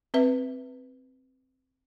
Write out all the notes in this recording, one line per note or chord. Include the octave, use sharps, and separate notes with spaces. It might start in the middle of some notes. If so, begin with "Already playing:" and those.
C4 B4 E5